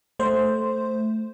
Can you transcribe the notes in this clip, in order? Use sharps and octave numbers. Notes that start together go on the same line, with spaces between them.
A3 C5